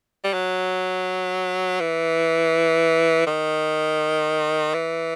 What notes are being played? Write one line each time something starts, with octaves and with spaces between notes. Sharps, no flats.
G3
F#3
E3
D#3
E3